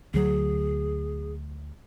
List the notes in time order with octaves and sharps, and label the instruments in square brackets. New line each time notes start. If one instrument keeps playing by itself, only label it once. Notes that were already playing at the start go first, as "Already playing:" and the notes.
[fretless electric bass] D2 F#3 [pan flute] G#4